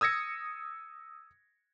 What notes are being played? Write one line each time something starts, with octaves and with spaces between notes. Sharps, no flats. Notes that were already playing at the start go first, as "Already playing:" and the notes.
D#6 E6 G#6 A#6 C#7